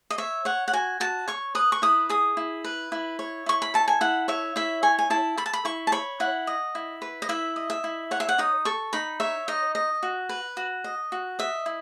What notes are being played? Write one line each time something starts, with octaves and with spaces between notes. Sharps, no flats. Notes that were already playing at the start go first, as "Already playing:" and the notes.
D#5
C#5 E5
C#5 F#5
F#5
F#4 G#5
F#4 A5
C#5 C#6
B4 D#6
C#6
E4 D#6
G#4 D#6
E4
B4
E4
C#5
E4 C#6
B5
A4 A5
G#5
E4 F#5
C#5 E5
E4 E5
C#5 G#5
G#5
E4 A5
A4 B5
A5
B5
E4 C#6
A5
C#5 B5
E4 F#5
D#5
E4
B4
D#5
E4 E5
D#5
E5
E4
C#5 F#5
E5
F#5
D#4 D#6
A4 C#6
D#4 B5
C#5 E5
D#4 D#5
D#5
F#4
B4
F#4
D#5
F#4
D#5 E5
E4